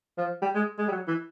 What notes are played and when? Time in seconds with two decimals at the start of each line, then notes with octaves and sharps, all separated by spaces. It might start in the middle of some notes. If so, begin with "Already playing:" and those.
0.18 F3
0.42 G3
0.55 G#3
0.79 G#3
0.88 G3
0.91 F#3
1.08 E3